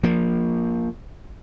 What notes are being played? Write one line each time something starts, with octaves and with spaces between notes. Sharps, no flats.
F3 A#3